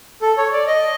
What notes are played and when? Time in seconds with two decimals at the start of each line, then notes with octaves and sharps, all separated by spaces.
0.22 A4
0.38 C#5
0.53 D5
0.67 D#5